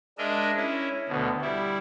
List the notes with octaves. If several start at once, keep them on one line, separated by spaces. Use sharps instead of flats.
G#3 D4 A#4 D#5 E5
C#4 E4
D2 B2
G3 E4